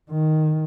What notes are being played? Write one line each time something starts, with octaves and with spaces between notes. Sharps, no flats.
D#3